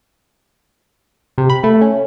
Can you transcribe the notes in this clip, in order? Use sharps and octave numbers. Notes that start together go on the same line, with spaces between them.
C3
B5
A3
C#4